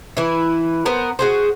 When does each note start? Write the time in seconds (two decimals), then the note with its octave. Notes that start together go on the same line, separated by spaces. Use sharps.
0.17 E3 E4
0.85 B3 A#4 C5
1.19 F#4 G#4 C5